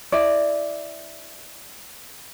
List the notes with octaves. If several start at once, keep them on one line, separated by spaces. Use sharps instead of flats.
E4 D5